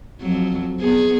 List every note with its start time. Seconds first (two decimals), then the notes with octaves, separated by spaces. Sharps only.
0.21 F2 F#3
0.80 B3 G#4